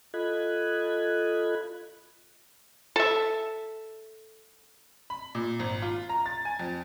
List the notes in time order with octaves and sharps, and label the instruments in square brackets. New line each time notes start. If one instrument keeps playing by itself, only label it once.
[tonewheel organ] F4 A4 D#5 B5 F#6 G#6
[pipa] A4 E5
[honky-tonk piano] B5
A#2
G#1
F4
A#5
A6
G#5
F2